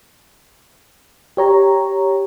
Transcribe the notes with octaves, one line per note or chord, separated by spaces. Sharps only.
G4 C#5 A#5